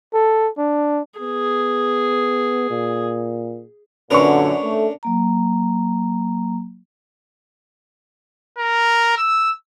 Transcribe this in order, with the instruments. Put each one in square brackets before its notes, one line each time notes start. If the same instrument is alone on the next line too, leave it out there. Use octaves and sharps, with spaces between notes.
[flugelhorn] A4
D4
[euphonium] B3 [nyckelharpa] G#4
[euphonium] A#2
[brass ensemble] F#2 A#2 D3 [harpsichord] C#4 D4 A#4 [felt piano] B4 C#6
[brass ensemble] A3
[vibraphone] F#3 A#3 A#5
[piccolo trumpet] A#4
E6